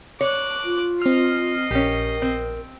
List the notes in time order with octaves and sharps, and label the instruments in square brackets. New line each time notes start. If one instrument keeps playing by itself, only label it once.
[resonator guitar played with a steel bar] C#5 [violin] D6 F#6
[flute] F4
[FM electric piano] C4 F6 [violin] D#5 C7
[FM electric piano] A#1 [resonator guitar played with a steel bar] C#4 G4 [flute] A#4
[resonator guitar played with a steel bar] C4